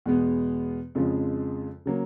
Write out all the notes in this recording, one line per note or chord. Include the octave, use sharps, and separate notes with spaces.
E2 B2 G#3 B3
F2 C#3 F3 G#3
C#3 F#3 A#3